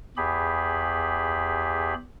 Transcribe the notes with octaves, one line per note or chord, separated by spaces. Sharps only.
E2 G4 G#4 B5